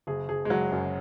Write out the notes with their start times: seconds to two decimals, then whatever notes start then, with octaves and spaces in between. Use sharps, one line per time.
0.07 F#1 G#4
0.29 F#1 G#4
0.45 G#3
0.50 F#1 F#3
0.72 F#2